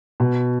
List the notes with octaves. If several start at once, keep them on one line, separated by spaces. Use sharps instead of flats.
B2